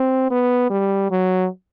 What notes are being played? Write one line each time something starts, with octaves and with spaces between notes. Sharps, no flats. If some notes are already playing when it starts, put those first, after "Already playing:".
Already playing: C4
B3
G3
F#3